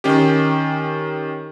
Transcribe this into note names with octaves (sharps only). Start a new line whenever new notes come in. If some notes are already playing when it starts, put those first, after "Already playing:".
D#3 C#4 G4